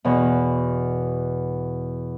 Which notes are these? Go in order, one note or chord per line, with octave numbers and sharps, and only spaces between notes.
E2 B2